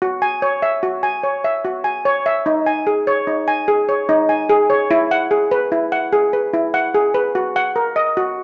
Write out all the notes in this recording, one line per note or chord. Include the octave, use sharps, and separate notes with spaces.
F#4
G#5
C#5
E5
F#4
G#5
C#5
E5
F#4
G#5
C#5
E5
D#4
G#5
G#4
C#5
D#4
G#5
G#4
C#5
D#4
G#5
G#4
C#5
E4
F#5
G#4
B4
E4
F#5
G#4
B4
E4
F#5
G#4
B4
F#4
F#5
A#4
D#5
F#4